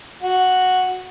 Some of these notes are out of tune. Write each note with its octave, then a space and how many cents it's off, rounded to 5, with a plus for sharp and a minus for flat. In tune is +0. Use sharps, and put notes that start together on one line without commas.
F#4 -5